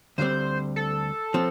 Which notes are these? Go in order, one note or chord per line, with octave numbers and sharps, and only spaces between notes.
D2 D3 G3 C4 C5
A4
F3 C4